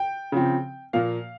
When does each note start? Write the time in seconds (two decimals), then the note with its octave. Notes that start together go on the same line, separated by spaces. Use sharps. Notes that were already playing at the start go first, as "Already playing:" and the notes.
Already playing: G5
0.32 C#3 F3 C4
0.93 A#2 F3 A#3 F5